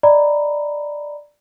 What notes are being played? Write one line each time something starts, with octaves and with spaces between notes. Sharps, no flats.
D5 D#5 A#5 B5